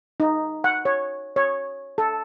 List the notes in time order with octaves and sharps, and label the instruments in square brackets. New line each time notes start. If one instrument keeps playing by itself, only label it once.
[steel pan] D#4
F#5
C#5
C#5
A4